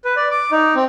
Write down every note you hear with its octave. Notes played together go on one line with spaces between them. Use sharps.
B4
D5
D6
D#4
C4